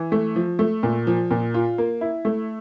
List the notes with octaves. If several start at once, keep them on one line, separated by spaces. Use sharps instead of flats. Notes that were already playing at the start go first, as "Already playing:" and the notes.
Already playing: E3
A3
F3
A3
A#2
F3
A#2
F4
A#3
E4
A3